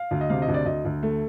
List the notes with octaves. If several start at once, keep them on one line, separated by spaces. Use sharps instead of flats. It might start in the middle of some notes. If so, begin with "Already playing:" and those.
Already playing: F5
D2
D#5
C3 F5
D#5
D2
D5
D2 D#5
D2
A3